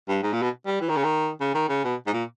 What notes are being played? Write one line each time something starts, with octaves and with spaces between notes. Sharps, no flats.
G2
G#2
A#2
B2
G3
E3
D#3
C#3
D#3
C#3
D#3
C#3
B2
G#2
A#2